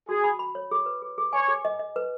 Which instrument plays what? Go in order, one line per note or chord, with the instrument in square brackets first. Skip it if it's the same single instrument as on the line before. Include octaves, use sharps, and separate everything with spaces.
[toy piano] F#4 [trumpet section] G#4
[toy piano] B5
B5
C#5
G#4
B4
G#4
G#4
[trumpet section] C#5 [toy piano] G#5
[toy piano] G#4
D#5
D#5
B4